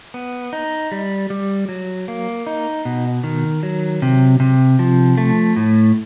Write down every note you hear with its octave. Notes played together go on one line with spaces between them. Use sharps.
B3
D#4
G3
G3
F#3
A#3
D#4
B2
D#3
F#3
C3
C3
F3
A3
A2